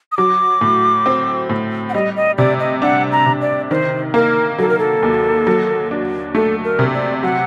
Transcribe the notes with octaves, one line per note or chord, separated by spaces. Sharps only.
D#6
F#3 D6
A2
C4
A2
F#5
G3 D#5
D#5
C3 D5
D#5
D4 F#5
A#5
C3
D5
D#3 C5
A#3 A#4
F#3 A4
A#4
A4
D#2
F#3
D4
A3 A4
A#4
C3
D5
F#3 F#5